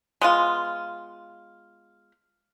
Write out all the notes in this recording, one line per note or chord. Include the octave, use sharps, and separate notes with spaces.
G#3 B3 F4